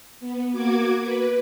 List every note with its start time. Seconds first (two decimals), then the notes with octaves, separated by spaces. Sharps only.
0.20 B3
0.52 A#3 F#4 D6 G#6
0.99 B4